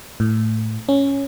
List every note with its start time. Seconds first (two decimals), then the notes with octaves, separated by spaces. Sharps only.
0.20 A2
0.89 C#4